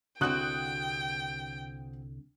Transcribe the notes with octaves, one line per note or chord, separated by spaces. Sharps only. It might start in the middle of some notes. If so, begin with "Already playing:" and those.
C2 D3 C4 F#4 G5 D#6 F#6